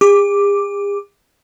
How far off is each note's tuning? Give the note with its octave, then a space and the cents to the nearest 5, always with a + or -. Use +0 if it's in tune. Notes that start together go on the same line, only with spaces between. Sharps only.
G#4 -45 D6 +0